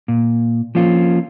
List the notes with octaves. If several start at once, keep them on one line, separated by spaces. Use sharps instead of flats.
A#2
F3 A#3 C#4 F4